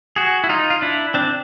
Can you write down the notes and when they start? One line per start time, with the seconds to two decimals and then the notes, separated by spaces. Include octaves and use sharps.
0.16 F#4 G#4
0.44 E4
0.49 D#4 F4
0.70 F4
0.82 D4 E4
1.14 C4 D4